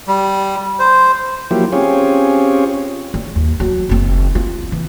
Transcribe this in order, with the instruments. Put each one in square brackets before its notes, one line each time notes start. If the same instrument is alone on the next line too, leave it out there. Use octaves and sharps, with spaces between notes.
[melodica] G3
C5
[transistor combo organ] F3 F#3 A#3 E4 G4
C4 C#4 F4 G4 G#4 C#5
[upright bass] G3
D#2
F#3
F#1 C4
F4
E3